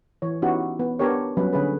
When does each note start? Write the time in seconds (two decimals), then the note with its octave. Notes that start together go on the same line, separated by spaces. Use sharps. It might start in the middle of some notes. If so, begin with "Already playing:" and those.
0.22 E3 C#5
0.42 B3 C#4 D#4 E4 F#4 G4
0.80 B3
0.99 B3 D4 G4 A#4 C#5
1.37 F#3 G3 B3 C#4 B4
1.53 D3 C#4 G#4 B4